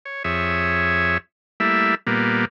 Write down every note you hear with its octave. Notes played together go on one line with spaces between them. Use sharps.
C#5
F2 G#4 C#5 E5
G3 A3 A#3 E4 E5
A#2 G3 A#3 B3